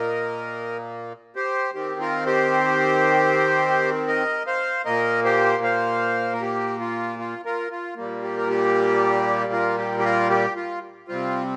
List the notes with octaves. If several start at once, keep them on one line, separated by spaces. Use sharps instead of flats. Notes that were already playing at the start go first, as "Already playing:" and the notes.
Already playing: A#2 A#3 A#4 D#5
G4 C5
D#3 C4 G4
F4 A#4
G4 C5
A#4 D#5
C5 F5
A#2 A#3 A#4 D#5
G4 C5
C5 F5
A#4
G4
F4
F4
F4 A#4
F4
A#2 G3 A#3
G4
A#4
G4
F4 A#4
G4
G4
F4 A#4
G4
F4
C3 G3 C4 F4